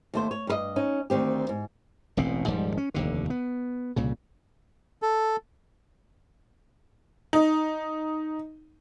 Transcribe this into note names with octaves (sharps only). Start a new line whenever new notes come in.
D#2 A3 C5
C#5
G2 A#4 D#5
C#4 D#4
D2 D#3 C4 G4
G#2
E1 A1 B2 C4
D#1 G#2 F3 G3
C#4
F1 D#2 D3
B3
C2 A#2 C#3
A4
D#4